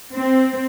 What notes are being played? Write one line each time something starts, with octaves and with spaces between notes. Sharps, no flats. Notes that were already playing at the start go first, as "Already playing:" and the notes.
C4